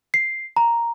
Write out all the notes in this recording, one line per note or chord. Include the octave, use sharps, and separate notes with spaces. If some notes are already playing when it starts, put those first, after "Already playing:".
C7
A#5